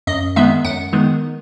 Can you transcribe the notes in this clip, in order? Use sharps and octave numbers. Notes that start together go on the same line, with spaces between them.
F#2 D#5
D#3 G#3 B3 E5
F#2 F#5
D#3 G#3 B3